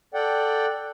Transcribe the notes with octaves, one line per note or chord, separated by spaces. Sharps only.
A4 D5 F#5 G5